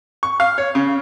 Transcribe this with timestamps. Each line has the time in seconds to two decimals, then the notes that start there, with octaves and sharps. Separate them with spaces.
0.23 C#6
0.40 F5
0.58 C#5
0.75 C#3